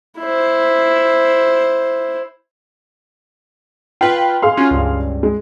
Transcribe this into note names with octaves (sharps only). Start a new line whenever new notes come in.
E4 C5
F4 B4 G5
G#4 F5 C6
C#4 F4 F#4
C#2 G2
G#3